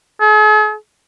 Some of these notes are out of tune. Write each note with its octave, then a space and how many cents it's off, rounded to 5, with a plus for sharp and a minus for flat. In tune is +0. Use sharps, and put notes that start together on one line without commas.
G#4 +45